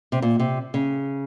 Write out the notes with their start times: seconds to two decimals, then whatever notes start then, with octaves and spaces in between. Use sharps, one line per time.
0.12 C3
0.22 A#2
0.39 C3
0.74 C#3